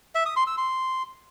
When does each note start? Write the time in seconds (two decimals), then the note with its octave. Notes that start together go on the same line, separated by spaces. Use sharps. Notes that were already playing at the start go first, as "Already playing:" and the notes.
0.15 E5
0.26 D#6
0.36 C6
0.47 E6
0.58 C6